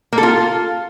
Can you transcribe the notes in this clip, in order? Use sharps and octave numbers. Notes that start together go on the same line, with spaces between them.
A#3
A4
F4